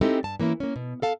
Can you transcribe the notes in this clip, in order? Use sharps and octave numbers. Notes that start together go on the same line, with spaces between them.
G#3 C4 D#4 E4 G4 A4
G2 A5
E3 A#3 C#4 E4
A#3 C#4
B2
A4 F5 A5